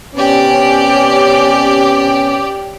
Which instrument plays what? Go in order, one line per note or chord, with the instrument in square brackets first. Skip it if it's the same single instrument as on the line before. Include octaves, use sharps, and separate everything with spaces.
[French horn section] C3 B3 C#4 [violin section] G4 D5